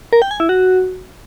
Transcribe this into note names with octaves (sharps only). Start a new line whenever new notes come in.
A#4
G5
G#5
E4
F#4